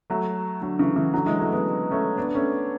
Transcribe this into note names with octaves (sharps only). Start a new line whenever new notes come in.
F#3 A3
D3 F#3
C#3 E3
C#3 E3
D3 F#3
E3 G#3
F#3 A3
G#3 B3
A3 C#4
B3 D4
A3 C#4